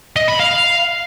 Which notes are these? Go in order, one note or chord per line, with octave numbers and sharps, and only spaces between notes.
D#5
B5
F5